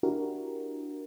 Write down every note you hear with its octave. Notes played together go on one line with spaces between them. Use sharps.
D4 E4 F#4 G4 A#4